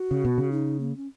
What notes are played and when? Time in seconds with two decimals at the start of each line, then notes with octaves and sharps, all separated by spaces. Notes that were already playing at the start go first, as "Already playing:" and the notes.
Already playing: F#4
0.11 C#3
0.25 B2
0.38 C#3
0.52 D#4
0.80 A#3
0.97 C#4